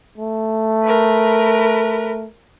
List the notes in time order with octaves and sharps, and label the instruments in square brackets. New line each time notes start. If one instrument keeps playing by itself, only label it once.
[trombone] A3
[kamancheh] A#4 B4